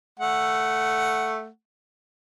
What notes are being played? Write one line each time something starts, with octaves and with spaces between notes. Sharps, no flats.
A3 F#5